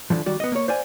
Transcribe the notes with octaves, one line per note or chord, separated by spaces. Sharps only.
D3 E3 F3
D#3 G3 F#4 D5
B3 D#5
A#3 C#5
C5 D5 F5 G#5